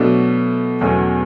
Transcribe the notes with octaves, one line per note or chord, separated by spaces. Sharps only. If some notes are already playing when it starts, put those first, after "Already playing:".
Already playing: B2 F#3 A3 D4
E2 B2 F#3 A3 C#4